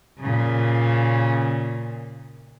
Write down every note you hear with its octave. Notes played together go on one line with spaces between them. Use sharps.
A#2 C#3